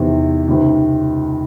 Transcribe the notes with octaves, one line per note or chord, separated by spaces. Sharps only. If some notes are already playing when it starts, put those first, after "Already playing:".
Already playing: E2 C3 D#3
C#2 C3 D#3